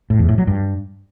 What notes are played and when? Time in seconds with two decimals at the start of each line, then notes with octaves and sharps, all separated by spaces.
0.10 A2
0.19 E2
0.29 A2
0.38 F#3
0.47 G2